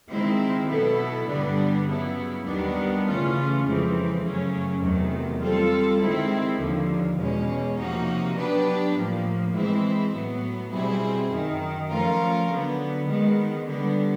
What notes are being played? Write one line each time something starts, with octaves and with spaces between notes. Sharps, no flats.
D#3 G#3 C4 E4
B2 F#3 B3 E4 A4
G2 D3 G3 B3 D4
C#3 F#3 B3 E4
D#2 D#3 G3 B3 D4
C#3 E3 A3 C#4 F4
F2 C#3 E3 G#3 C4
F#2 C#3 F#3 A3 C#4
E2 C3 D#3 F#3 A3
G3 C4 F4 A4
D#3 G#3 C4 E4
D#2 D3 F3
E2 B2 G#3 C#4
C3 F3 A#3 D#4 F#4
F#3 B3 D4 G4 B4
A2 F3 A#3
E3 G#3 C4 E4
A2 F#3 B3
B2 G3 C4 E4 G#4
F#2 D#3 F#3
F3 A3 C#4 F4 A#4
D3 F#3 B3
D#3 G#3 B3
D3 G3 B3